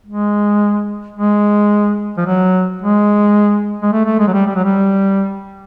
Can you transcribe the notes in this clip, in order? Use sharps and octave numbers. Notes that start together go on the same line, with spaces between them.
G#3
G#3
F3
F#3
G#3
G#3
A3
A3
G#3
F#3
G3
G3
F#3
G3